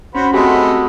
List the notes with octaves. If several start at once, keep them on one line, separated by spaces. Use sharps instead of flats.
C#4 F#4 C5 B5
G#3 A3 C4 F#4 G4 B5